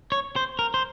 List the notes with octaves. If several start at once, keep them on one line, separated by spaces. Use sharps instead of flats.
C#5
C5
A#4
C5